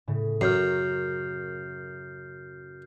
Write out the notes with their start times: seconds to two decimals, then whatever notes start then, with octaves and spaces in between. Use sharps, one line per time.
0.07 A2 C#3
0.41 F#2 A#4 C#5 F6 G6 C7